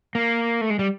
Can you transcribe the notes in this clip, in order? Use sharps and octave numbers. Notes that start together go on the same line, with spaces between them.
A#3
A3
G#3
G3